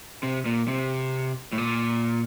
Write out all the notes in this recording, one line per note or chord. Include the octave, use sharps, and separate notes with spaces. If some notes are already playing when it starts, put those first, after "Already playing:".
C3
A#2
C3
A2
A#2